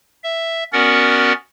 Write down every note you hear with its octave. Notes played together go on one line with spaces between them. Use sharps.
E5
B3 C#4 F#4 A#4 D5 F#5